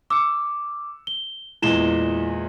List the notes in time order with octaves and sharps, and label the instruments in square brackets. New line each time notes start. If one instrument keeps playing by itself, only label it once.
[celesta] D6 [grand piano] E6 C#7
[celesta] G7
[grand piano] E2 A#2 G#3 [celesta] E4 E7 G7